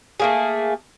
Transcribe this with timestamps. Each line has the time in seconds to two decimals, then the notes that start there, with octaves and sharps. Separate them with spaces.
0.20 A3 A#3 G#4